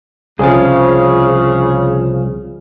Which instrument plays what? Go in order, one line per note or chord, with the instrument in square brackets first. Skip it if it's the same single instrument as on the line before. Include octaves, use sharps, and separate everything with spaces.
[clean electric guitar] C2 F3 [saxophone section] C#3 [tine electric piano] G#4